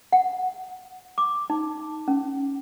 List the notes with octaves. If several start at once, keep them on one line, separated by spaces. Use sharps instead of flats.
F#5
D6
D#4
C#4